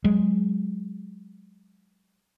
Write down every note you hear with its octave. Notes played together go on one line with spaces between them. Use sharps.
F#3 G#3